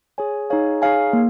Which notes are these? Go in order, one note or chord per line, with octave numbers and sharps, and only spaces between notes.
G#4 C#5 G#5
D#4 G#4 C#5 F5 G#5
D#4 G#4 C#5 F5 G#5
A#3